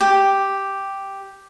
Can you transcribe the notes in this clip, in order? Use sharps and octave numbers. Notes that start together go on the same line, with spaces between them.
G4